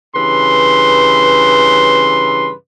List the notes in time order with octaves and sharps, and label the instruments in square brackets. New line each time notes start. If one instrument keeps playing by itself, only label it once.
[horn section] G2 C#3 E3 B4 C6